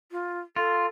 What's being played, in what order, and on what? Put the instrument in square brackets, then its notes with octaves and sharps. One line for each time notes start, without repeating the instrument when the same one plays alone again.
[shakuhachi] F4
[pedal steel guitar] F4 [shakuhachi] A4